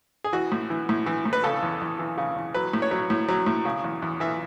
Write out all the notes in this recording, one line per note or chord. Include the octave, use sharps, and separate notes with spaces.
G#4
E3 F#4
A2
E3
A2
E3
A2
B4
C#3 A4
E2
E2
E3
C#3
E2
F#3 B4
A2
C#5
F#3
A2
F#3
A2
C#3
E2
E2
E3 E5